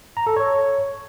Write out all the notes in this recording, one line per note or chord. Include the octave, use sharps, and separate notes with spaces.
A#5
A4
C#5